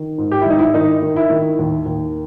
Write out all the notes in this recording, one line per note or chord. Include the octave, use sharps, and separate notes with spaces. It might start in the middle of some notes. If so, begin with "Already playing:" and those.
Already playing: D#3
G#2
G4
E4
G#1 D#4
E4
D#3 D#4
D#3
E4
D#3
D#2
D#2